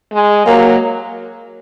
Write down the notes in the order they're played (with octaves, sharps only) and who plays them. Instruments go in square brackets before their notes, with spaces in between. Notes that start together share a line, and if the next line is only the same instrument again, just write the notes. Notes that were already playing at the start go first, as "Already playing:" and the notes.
[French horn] G#3
[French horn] F#3 [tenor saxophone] A#3